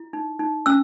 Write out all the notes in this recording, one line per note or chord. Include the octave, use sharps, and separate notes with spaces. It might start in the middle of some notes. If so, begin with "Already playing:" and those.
Already playing: E4
D#4
D#4
C#4 E6